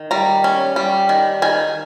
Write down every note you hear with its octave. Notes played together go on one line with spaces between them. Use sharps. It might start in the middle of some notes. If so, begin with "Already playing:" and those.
Already playing: D#3
G3 A#5
C#4
G3
D#3
D#3 G#5